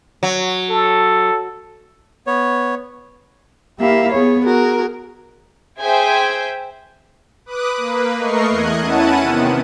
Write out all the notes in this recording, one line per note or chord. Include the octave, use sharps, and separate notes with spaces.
F#3
A4
B3 C#5
A#3 E4 G4 E5 F5
B3 G#4 C#5
F#4 G#4 A#4
G#4 C5 E5 G5 G#5 G6
B4 D6 D#6 F#6
A#3 B4
A3 A#4 D#5 C#6 C7
E2 D#5 F#6 G#6
C#4 E4 F#5 A5 D#7
C3 D#3 B3